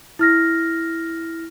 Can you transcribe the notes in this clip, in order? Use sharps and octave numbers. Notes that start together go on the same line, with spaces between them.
E4 F6 A#6